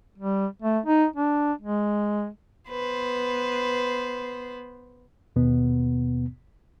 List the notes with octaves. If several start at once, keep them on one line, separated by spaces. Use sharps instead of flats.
G3
A3
D#4
D4
G#3
B3 B4 C5
D#2 B2 B3